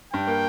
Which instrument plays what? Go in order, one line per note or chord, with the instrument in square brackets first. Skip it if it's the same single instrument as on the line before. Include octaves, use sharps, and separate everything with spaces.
[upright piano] G2 [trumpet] G5
[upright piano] A#3